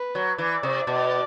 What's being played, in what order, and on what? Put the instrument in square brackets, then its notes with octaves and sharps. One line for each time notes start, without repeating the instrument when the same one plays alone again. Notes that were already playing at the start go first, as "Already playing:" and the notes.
Already playing: [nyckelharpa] B4
[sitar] F#3
[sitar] E3 [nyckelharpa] D5
[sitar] C3
B2